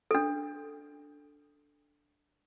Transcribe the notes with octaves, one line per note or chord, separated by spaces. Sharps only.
D4 A4